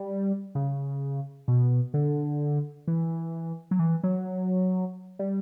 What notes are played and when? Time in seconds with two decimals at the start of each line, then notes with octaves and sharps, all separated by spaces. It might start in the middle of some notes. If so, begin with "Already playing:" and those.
Already playing: G3
0.55 C#3
1.48 B2
1.94 D3
2.88 E3
3.71 F#3
3.79 E3
4.04 F#3
5.19 G3